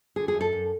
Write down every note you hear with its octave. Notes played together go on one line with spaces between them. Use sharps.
D3 G#4
G#4
F#2
A4
F#2